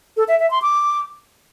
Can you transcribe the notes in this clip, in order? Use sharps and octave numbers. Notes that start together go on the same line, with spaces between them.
A4
E5
E5
C6
D6